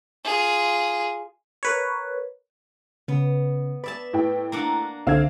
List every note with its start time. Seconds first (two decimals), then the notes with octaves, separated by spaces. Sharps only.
0.25 F4 G#4
1.63 A#4 B4 C#5
3.08 C#3 B3
3.84 B4 D5 E5 A5
4.13 A2 E4 G5
4.52 A#3 D4 F#5 A#5
5.07 C2 D3 C4 E5 F5 G#6